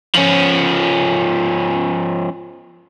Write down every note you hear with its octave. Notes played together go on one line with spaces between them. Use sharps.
F3 C#4